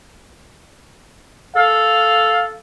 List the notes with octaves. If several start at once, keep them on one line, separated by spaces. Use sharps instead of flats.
A4 F5